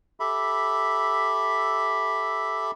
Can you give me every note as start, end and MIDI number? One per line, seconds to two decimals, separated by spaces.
0.20 2.71 67
0.20 2.71 69
0.20 2.71 76
0.20 2.71 83